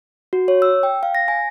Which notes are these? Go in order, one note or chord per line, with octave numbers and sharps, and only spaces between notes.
F#4
C#5
E6
G5
F5
A#6
G#5